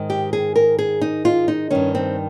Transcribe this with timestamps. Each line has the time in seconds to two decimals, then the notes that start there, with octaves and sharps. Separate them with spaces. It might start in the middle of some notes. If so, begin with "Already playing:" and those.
Already playing: G#2 D#3
0.10 G4
0.33 G#4
0.56 A#4
0.79 G#4
1.01 D#4
1.25 F4
1.48 D#4
1.70 G2 D#3 C#4
1.95 C4